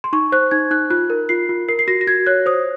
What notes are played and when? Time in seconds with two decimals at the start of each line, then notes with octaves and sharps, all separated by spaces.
0.04 C6
0.13 D#4 C#6
0.32 C5 F#6
0.51 D#4 G#6
0.71 D#4 F#6
0.90 F4 F#6
1.10 A#4
1.29 F4 C7
1.49 F4
1.68 A#4 C7
1.79 C7
1.88 F#4 A#6
2.01 A#6
2.07 F#4 G#6
2.27 C#5 F#6
2.46 C5 D#6